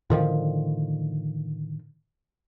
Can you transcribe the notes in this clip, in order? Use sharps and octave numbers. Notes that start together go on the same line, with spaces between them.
A2 D3 D#3 F3